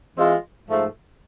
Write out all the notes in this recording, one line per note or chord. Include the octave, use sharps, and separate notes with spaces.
E3 G#3 C4 F4
G#2 F3 A3